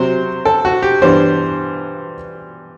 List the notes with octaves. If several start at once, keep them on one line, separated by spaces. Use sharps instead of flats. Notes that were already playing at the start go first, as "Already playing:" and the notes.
Already playing: C3 F#3 C4 C5
A4
F#4
G4
G2 E3 B3 D4 C5